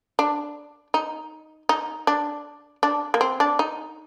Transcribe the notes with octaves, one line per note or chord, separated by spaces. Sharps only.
D4
D#4
D#4
D4
D4
A#3
C4
D4
D#4